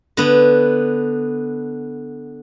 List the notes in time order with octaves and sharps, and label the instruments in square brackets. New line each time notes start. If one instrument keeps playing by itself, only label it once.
[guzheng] D3 B3